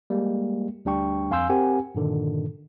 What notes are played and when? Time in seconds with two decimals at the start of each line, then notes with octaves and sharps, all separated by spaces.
0.10 G3 G#3 A#3
0.85 D2 G3 D4 G5 C#6
1.31 F2 F5 G#5 C6 E6 G6
1.49 C4 G4 A#4 F#5 G#5
1.95 G2 A#2 D3 D#3